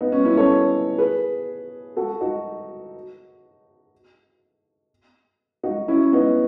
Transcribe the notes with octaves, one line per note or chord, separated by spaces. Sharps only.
B3 D#4
C#4
C#4 E4
A4 C#5
G#4 B4
F#4 A4
D#4 F#4
D#4 F#4
C#4 E4
B3 D#4